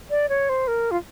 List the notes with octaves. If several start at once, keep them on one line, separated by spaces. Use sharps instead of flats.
D5
C#5
C5
A#4
F4